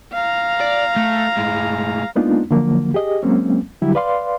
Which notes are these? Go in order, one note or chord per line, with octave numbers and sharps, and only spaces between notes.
F5 A#5
D5
A3
A2 G#3
G#3 A#3 B3 D4 D#4 F4
D3 F3 F#3 A#3
G4 G#4 D#5
F#3 G#3 A#3 C4 C#4
D3 F#3 G3 E4 G4
B4 D5 F5 C6